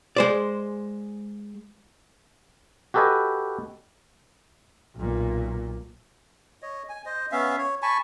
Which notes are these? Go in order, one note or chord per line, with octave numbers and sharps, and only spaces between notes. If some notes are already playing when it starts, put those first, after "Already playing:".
G#3 C5 D5
F#4 G4 A4 B4 D#5 G#5
B1 A#2
C#5 D#5
G#5
C5 D#5
B3 C#4 E5 F5
C#5
G#5 A5 B5 C#6